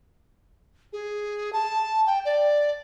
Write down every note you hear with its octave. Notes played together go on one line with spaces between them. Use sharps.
G#4
A5
G5
D5